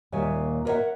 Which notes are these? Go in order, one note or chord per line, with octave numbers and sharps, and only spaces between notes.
D#2 A#2 G3 C#5 E5 G#5
A#4 B4 C#5 D5 E5 F#5